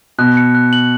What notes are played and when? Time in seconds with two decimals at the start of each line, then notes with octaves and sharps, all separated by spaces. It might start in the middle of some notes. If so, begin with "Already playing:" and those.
0.19 B2 F#6
0.37 C#7
0.55 F#6
0.73 F#7